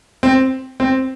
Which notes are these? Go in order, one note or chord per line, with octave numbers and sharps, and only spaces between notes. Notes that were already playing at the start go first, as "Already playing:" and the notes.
C4
C4